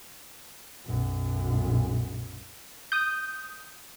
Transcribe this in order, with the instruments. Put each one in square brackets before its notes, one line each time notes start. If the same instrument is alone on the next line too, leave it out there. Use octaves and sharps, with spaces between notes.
[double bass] B1 F#2
[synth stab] D#6 G6